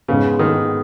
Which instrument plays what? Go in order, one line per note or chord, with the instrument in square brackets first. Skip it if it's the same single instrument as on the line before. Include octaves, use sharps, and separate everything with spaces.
[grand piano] G#2 G#3 B3 [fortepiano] C#3
[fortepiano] D#3